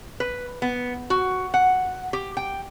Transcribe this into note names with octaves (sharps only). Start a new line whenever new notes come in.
B4
B3
F#4
F#5
G4
G5